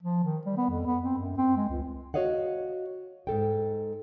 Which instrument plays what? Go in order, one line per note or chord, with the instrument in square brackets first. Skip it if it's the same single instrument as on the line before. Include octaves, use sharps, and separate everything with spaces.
[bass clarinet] F3
D#3
G3
B3
F2
B3
C4
F#2
C4
G#3
C#2
[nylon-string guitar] F#4 G#4 C#5 D#5 F5 F#5
G#2 C3 A4 G5